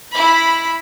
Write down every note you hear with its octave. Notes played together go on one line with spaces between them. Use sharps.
E4 B5